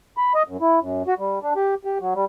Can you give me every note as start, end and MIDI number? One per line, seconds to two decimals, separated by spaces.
0.17 0.33 83
0.34 0.43 75
0.48 0.57 42
0.61 0.80 64
0.81 1.03 42
1.07 1.14 66
1.19 1.39 55
1.42 1.53 62
1.56 1.75 67
1.85 1.98 67
2.00 2.14 54
2.15 2.25 55